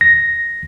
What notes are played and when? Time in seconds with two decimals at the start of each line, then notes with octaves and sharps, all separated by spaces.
0.01 A#6